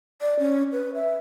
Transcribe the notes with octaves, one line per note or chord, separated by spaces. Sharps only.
D5
C#4
B4
E5